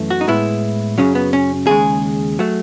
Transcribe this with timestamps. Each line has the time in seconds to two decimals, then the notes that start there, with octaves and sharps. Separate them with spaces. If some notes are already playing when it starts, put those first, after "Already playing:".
Already playing: F#2 E3 A3
0.10 F#4
0.21 D#4
0.28 A2 G#3 B3 E4
0.98 F#2 C#3 F#3 C#4
1.15 B3
1.33 C#4
1.67 D#2 C#3 G#3 G#4
2.39 F#3 A3